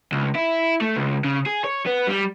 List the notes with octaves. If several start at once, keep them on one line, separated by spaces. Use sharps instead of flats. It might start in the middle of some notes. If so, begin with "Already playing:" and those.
C#2
E4
A3
C#2
C#3
G#4
C#5
B3
G3